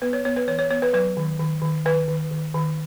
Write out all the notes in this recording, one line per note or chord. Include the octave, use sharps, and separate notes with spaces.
B3 B4
C#5
B3 C#5
B4
E3 C#5
C#5
B3 C#5
B4
F#3 B4
D#3
D#3
D#3
D#3 B4
D#3
D#3
D#3